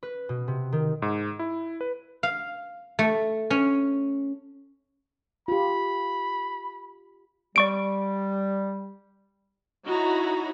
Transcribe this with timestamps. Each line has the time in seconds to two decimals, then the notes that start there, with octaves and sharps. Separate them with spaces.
0.03 B4
0.29 B2
0.48 C3
0.72 D#3
1.02 G#2
1.39 E4
1.81 B4
2.23 F5
2.99 A3
3.50 C#4
5.48 F4 G4 B5
7.56 G3 D5 C#6 D7
9.87 D#4 E4 F#4 C#5 A#5 B5